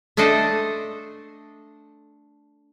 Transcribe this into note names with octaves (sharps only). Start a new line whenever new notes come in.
A3 D4 A4 C5 D#5